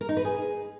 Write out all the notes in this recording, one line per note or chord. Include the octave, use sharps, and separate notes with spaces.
A#4
D#4
B4
G#4